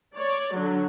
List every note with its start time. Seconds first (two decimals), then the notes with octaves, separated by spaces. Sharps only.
0.16 C#5 D5
0.54 D3 F#3